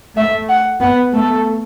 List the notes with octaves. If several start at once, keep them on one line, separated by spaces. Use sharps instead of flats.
A3 E5
F#5
B3 F#5
A3 A4